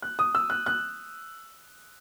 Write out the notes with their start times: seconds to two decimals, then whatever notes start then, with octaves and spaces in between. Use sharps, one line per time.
0.02 F#6
0.19 D#6
0.35 E6
0.50 F#6
0.66 F#6